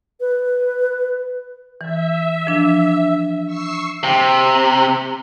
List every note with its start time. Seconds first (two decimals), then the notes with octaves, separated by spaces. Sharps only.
0.20 B4
1.81 E3 E5
2.47 F3 D4
3.45 C#6 E6 C7
4.04 C3